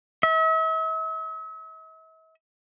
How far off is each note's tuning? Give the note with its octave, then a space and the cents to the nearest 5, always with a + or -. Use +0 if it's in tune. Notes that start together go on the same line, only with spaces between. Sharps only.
E5 -45